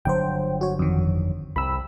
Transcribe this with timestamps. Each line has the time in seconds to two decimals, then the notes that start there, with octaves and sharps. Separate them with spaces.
0.05 G1 D3 F#3 C5 G5
0.61 F#4 C#5
0.79 F2 D#3
1.56 C2 B5 E6